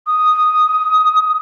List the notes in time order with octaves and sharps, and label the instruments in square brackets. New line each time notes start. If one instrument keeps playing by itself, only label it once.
[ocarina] D#6